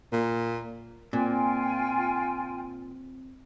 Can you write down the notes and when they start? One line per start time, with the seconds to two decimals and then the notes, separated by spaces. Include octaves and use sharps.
0.12 A#2
1.13 A#2 C4 F4 G5 G#5